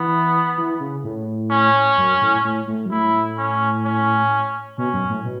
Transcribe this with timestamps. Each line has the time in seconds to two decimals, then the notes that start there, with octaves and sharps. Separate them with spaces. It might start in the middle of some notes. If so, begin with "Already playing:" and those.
Already playing: E3 B3
0.58 E3
0.80 C#3
1.04 A2
1.51 C#4
1.97 F#2
2.21 A2
2.44 A2
2.67 A2
2.86 F#2
2.91 A2 E4
3.38 C#4
3.85 C#4
4.78 B2 C#4
4.93 F#2
5.09 A2
5.25 B2